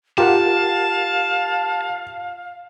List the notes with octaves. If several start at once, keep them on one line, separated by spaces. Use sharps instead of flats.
F4 G4 A#4 F5 F#5 A5